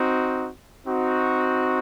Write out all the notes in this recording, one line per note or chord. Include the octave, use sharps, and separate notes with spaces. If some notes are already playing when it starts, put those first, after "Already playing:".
Already playing: C4 D#4 F#4
C4 D#4 F#4